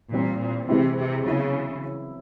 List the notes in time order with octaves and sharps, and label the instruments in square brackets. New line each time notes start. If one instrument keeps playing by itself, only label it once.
[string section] A#2 [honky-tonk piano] E3 G3 C4
[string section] A#2
[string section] C3 [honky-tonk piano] E3 G#3 C4 E4
[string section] C3
[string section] C#3 [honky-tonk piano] F#3 B3 E4